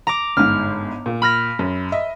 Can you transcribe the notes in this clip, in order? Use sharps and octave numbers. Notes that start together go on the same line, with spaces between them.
A#5 D6
G1 G#2 F6
A#2
B5 F6 A#6
F#2
D#5 E5